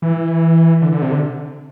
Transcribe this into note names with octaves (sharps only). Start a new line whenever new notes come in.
E3
D3
D3
C3
D3